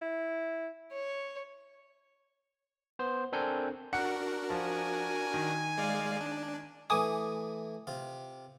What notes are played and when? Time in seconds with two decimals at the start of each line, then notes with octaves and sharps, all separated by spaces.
0.02 E4
0.92 C#5
2.99 B3 C5
3.33 C4 D4 A4 A#4 G#5 G6
3.93 D4 F#4 A#4 F#5 F#6 C#7
4.50 F3 G#5
5.34 D#3
5.78 G#3 D5 F5
6.21 D4
6.90 E3 A3 E4 G#5 D6 D#6
7.87 C3 F4